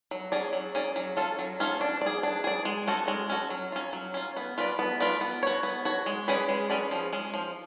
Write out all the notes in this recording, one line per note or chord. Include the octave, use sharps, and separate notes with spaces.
F#3
C#4 G#4 D5
F#3
C#4 G#4 D5
F#3
C#4 F4 A4
F#3
C#4 F4 A4
D4
G#4 D5
D4
G#4 D5
G#3
C#4 F#4 A4
G#3
C#4 F#4 A4
F#3
C#4 F4
F#3
C#4 F4
B3
F4 B4 D5
B3
F4 B4 D5
B3
F#4 C#5
B3
F#4 C#5
G#3
C#4 G#4 B4 D5
G#3
C#4 G#4 B4 D5
F3
G#3 C#4
F3